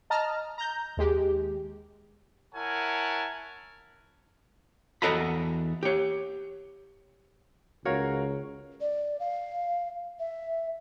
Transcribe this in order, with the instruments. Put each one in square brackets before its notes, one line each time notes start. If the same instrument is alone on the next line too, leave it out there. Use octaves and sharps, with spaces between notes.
[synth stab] D#5 A5 A#5 F6
A#5 G6
D#2 G#3 G4
[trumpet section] E4 A#4 C#5 F#5 G#5 A5
[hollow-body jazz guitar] E2 F#4 A4 D#5 A#5 B5
G4 C#5
[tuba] C#2 [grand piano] F#4 A#4 F5 [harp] C#5
[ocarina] D5
F5
E5